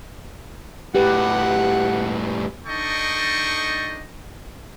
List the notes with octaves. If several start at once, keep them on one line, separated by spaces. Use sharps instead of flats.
A2 G3 G4 B4 F#5
D4 D#4 A4 D#5 G5 C#6